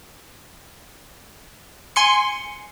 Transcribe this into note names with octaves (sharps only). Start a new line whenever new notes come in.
G#5 C6 C#7